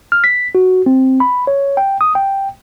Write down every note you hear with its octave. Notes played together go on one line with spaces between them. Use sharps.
F6
B6
F#4
C4
B5
C#5
G5
D#6
G5